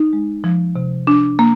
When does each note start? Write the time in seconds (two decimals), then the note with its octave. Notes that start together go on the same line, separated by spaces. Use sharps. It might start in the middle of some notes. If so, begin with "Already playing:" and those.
Already playing: D#4
0.13 G#3
0.44 F3
0.76 C3
1.07 D4
1.39 A#3